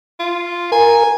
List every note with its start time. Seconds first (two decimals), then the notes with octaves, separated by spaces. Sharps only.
0.19 F4
0.72 A#4 G#5